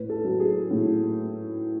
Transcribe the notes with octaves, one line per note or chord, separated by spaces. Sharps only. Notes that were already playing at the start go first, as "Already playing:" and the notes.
Already playing: A2 B4
A4
F#3
G#4
A2